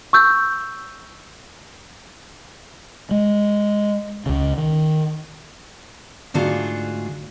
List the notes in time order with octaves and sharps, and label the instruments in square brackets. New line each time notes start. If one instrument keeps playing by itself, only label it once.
[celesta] C#6 E6 G6
[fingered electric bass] G#3
C#2 C#3
D#3
[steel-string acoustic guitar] G#2 D3 A3 F4 F#4 G#4